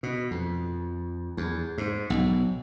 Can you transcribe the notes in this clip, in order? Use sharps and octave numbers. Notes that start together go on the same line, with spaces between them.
B2
F2
E2
G#2
B1